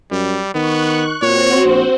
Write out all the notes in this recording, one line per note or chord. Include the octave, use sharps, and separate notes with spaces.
F#2 G3
D#3 B3 C#6 F#6
A#2 C4 F#4 C5 C#5
A#1